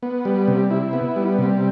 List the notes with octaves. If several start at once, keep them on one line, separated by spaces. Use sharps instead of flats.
B3
G3
C3
E4
B3
G3
C3